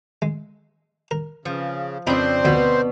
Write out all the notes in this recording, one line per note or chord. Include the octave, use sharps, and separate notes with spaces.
G#3
A#4
C#3 F3
F2 C#3 C4 D4 D#4 C5 B5
D2 B2 B3